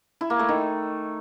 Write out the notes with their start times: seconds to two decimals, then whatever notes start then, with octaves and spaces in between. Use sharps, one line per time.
0.21 E4
0.30 A#3
0.39 A3
0.49 D#3